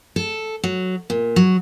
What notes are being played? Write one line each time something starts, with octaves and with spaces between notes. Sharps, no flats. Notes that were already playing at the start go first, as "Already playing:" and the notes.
A4
F#3
A#2
F#3